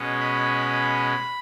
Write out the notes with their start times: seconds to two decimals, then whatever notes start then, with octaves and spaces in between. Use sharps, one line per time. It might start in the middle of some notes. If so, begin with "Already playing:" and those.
Already playing: B2 G#3 C#4
0.20 B5